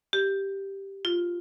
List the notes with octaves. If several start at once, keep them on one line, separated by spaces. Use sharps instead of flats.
G4
F4